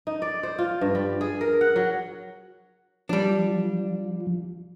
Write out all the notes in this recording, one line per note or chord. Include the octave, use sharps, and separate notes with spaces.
D#4
D5
C5
F4
G2
G3
G#4
A#4
F#5
F#3
F3 G3 D4